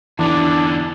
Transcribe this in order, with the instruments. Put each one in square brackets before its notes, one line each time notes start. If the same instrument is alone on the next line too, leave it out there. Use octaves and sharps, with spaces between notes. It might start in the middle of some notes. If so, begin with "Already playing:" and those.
[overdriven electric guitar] E2 D3 [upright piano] E3 [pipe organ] D4